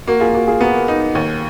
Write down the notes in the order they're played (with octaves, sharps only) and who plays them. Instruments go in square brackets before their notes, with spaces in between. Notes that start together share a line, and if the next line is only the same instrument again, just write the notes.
[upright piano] A#3 [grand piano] F#4 A#4
[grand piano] F4 G#4
[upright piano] A#3 [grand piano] F#4
[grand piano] F4 G#4
[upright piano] B3 [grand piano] F#4 A#4
[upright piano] D#4
D#2